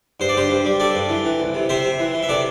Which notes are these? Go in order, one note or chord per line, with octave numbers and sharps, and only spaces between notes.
G2 C5
D5
G2 G4 C5
G2
G3
G3 A4 D5
G2
E3
E3
C2
C3
C3 C5 E5
C3
E3
E3
E5
C3 A4 D5